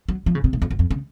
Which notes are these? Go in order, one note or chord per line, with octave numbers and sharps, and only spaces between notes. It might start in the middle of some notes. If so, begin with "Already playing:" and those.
F#3
F3
C#3
C3
G#2
F2
F#2
F2
C#3